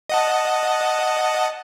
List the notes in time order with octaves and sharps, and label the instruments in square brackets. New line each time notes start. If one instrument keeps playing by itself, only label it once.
[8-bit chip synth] D#5 F#5 A5